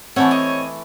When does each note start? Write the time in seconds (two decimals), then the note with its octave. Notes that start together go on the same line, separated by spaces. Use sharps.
0.16 E3 A3 C4 C#5 F#5 G#5 A5
0.31 D#5